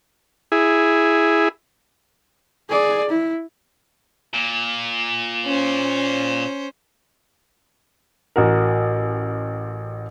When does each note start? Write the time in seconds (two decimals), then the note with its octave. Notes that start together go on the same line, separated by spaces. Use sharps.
0.52 E4 G#4
2.69 G#4 D5
3.10 E4
4.34 A#2
5.45 C#4 C5
8.36 A1 F#4 A#4